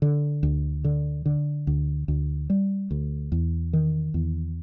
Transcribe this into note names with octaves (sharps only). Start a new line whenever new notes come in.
D3
D2
D3
D3
D2
D2
G3
D2
E2
D#3
E2